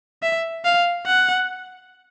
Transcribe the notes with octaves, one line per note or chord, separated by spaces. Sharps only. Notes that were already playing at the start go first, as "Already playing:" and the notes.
E5
F5
F#5